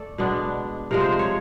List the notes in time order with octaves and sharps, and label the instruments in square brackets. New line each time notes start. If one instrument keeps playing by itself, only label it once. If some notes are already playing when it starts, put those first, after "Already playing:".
Already playing: [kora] A3 A4 D5
B2 G#3 B3 D4
C3 F3 G#3 A#4
C5
C#5